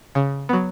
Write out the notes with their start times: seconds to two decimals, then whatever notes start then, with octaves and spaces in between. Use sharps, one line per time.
0.15 C#3
0.49 F#3 B3